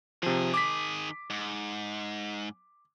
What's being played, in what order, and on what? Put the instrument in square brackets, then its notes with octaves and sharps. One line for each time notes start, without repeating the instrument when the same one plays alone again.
[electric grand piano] C3 F3 [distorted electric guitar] D#3 G#4
[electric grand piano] D6 B6
[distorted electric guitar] G#2